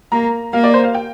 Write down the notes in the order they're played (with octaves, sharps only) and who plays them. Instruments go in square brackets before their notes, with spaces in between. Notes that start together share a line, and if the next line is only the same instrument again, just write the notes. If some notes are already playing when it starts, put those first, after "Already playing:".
[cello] A#3 [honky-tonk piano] A#5
[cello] A#3 [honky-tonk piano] F5
[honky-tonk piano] D5
C5
F5
G5